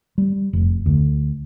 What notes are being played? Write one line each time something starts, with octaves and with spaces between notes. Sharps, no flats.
G3
F1
D2